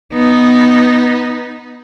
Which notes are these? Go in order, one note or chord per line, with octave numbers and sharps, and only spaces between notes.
B3 D#4